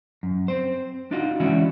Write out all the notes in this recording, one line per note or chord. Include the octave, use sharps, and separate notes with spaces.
F#2
C4 C5
D4 D#4 F4 F#4
E3 G#3 C#4 D4 E4 F#4